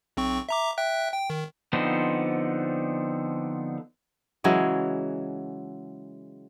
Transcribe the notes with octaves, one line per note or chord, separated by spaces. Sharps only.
B1 C4 C#6
E5 A#5 D6
E5 G5 F#6
G5
D#3
D3 F3 B3 C4 D#4
C#3 E3 F#3 G#3